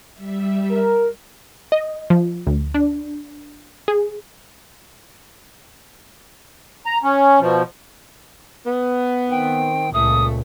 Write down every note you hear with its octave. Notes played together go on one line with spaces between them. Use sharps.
G3 E5
A#4
D#5
F3
D2
D4
G#4
A#5
C#4
B2 F3
B3
D#3 C4 G5
C#2 A#2 A3 D#6